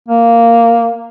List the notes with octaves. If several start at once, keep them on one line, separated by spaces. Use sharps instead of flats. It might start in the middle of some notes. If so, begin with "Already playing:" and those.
A#3